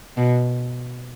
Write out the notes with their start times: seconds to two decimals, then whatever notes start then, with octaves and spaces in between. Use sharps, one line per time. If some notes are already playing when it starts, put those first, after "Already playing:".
0.17 B2